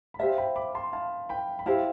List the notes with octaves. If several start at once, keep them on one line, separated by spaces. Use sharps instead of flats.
B5
G4 C5 E5 F5 A5
G5 B5
B5 D6
A5 C6
F5 A5
G5 B5
B5
E4 G4 C5 F5 A5